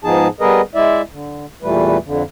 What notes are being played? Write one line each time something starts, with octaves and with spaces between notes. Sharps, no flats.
G#2 F3 B3 D#4 G#4 A5
G3 B3 G#4 A#4 B4 D#5
G#3 E4 D5 E5
D3
E2 A#2 E3 G3 A3 B4
F2 D3